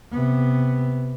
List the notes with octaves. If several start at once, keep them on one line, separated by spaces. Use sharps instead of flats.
C3 B3